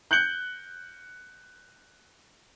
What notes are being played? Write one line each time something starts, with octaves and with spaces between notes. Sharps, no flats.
F#6 G6 C#7 F#7 G7